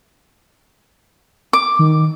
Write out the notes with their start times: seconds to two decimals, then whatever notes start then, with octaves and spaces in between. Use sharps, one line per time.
1.53 D6
1.79 D#3